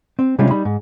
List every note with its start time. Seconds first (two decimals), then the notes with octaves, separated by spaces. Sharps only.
0.19 C4
0.39 C3 G3 G#3 C#4 D4 F4
0.51 G3 D#4 B5
0.65 G#2